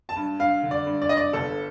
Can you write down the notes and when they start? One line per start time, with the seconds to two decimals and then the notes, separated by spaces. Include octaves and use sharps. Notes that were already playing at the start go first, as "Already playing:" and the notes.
0.09 A5
0.16 G2
0.39 G2 F5
0.63 D3
0.71 D5
0.86 G2
1.02 D5
1.09 G2 D#5
1.17 D5
1.33 G1 A4